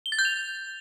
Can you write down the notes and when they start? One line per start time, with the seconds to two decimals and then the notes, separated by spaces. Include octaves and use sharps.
0.06 G7
0.12 A6
0.19 G6
0.25 F7